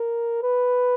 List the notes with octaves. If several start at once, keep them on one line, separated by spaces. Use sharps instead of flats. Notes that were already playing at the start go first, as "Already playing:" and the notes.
Already playing: A#4
B4